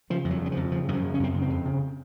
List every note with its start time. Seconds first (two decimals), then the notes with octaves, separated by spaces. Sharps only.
0.10 C#3 F3
0.25 F2
0.31 F#3
0.41 C#3
0.46 F#3
0.52 F3
0.57 F2
0.71 C#3 F3
0.88 F#2 D#3
0.93 F3
1.03 C#3
1.14 C#4
1.20 F#2 C4
1.33 C#3 A#3
1.42 C4
1.50 F2
1.65 C#3